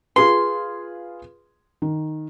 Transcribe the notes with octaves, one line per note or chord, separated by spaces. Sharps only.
F4 G#4 B4 C6
D#3